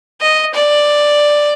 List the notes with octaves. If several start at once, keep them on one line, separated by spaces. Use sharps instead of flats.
D#5
D5